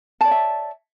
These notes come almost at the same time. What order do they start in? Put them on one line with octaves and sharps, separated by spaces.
A5 D5 C#5 E5